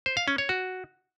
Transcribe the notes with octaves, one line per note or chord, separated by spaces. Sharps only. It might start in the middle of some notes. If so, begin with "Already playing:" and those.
C5
F5
C#4
C#5
F#4